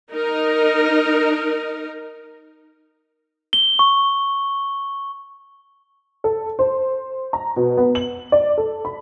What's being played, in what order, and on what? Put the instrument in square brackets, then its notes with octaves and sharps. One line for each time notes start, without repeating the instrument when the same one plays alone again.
[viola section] D#4 A#4
[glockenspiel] G7
C#6
[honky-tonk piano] A4
C5
A#5
B2
B3
F#7
D5
A4
B5